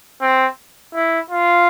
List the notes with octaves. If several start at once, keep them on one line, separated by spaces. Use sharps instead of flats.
C4
E4
F4